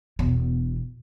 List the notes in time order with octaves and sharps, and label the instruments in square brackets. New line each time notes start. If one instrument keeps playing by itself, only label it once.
[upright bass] E1 B2